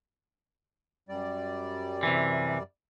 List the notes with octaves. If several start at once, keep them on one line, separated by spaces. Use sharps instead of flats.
F#2 G3 D5
C3 E3